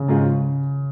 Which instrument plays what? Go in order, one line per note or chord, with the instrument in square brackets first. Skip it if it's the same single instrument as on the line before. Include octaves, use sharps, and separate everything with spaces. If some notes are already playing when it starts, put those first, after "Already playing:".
Already playing: [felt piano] C#3
[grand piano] G#2 G#3 C#4 F4